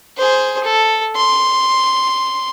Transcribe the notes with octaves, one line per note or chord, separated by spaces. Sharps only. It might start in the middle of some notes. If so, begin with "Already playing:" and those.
G#4 C5
A4
C6